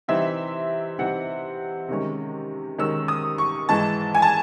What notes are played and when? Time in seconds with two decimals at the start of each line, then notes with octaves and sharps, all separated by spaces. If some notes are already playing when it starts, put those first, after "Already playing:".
0.08 C3 E3 C4 D#4 E5
0.99 C3 E3 C4 D#4 F#5
1.88 C3 D#3 G#3 C#4
2.78 C3 D#3 G#3 C#4 E6
3.08 D#6
3.38 C#6
3.69 G#2 E3 G#3 A5
4.15 G#5
4.22 A5